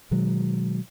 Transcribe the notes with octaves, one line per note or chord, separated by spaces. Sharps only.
B2 D#3 F#3 G#3